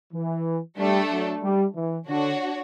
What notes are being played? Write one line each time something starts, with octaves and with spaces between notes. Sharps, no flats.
E3
G3 A3 D4 A4
F#3
G3
E3
D3 D4 F#4 C#5